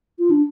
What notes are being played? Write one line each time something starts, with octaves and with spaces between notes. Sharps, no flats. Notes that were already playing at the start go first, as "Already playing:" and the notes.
F4
D4